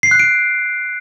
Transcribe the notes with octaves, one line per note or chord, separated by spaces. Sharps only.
C7
F#6
D7